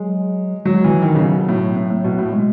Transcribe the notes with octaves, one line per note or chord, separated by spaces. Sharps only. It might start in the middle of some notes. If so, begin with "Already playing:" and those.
Already playing: F#3 G#3
F#3 G#3
E3
F#3
D#3 E3
C#3 F#3
B2
A2
A2
A2
B2
A2
G#3